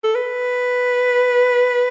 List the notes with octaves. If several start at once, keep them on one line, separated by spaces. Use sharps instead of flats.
A4
B4